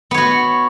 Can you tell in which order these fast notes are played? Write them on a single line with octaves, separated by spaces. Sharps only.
B3 C#5 F#4